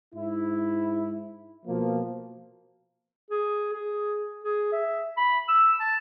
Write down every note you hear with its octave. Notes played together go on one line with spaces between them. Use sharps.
G#2 E4
B2 F3 A#3
G#4
G#4
G#4
E5
B5
E6
A5